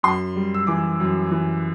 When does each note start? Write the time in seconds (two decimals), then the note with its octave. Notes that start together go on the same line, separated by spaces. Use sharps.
0.03 F#2 C6
0.36 G3
0.54 E6
0.67 E3 D6
1.00 F#2
1.31 E3